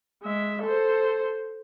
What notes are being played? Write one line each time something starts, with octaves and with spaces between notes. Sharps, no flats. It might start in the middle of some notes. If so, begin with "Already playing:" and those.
G#3 E5
A4 C5